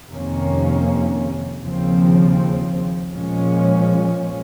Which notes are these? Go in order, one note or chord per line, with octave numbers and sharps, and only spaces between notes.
F2 C3 D#3 A#3 C#4
D#2 C#3 F3 C4
A#2 F3 G#3 C#4